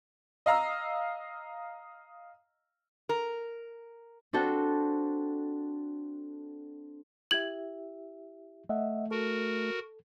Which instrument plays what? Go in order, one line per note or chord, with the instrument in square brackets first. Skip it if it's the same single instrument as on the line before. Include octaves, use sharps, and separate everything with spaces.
[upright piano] D#5 F5 A#5 E6
[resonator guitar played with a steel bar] A#4
[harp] C4 D4 F#4 A4 G5
[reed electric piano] E4 G4 E5 [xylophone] G#6 F#7
[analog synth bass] A3 [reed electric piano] D#5 E5 F#5
[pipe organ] F#4 A#4 [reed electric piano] A4